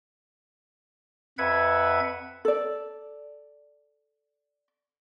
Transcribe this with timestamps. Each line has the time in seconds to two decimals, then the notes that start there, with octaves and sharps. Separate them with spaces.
1.38 F2 B4 E5 F#5 G#6
2.45 A4 D5